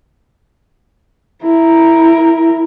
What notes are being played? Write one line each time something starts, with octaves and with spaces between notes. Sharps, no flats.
E4 A#4